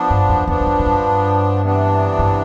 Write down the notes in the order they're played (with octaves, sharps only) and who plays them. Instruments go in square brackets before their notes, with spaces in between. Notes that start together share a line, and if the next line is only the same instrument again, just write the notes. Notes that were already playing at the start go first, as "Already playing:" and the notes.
Already playing: [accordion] F3 B3 D4
[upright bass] G2
F2
[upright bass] E2 [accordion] F3 B3 D4
[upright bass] E2
F2
A2
G2
[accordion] C3 E3 B3 D4
[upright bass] G2